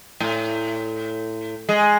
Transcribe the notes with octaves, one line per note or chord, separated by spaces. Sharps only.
A2
G#3